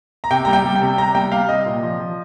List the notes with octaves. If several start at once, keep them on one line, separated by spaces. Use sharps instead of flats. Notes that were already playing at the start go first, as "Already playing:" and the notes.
A#5
C3 G5
G3 A#5
G5
G3
G5
C3
C3 A#5
G3 G5
G3 F5
C3 D#5
A#2
F3
F3